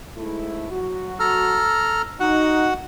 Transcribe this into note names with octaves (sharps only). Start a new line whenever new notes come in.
G#2 A3 E4
F#3 F#4
A4 A#5 F6
D#4 F#4 F#5